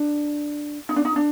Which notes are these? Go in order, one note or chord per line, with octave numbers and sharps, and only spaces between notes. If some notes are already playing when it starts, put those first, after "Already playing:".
Already playing: D4
D#4
D4
D#4
D4